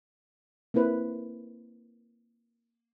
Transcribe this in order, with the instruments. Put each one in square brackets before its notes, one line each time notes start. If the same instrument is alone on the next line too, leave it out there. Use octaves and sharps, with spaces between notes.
[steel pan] A#3 C4 E4 B4 C5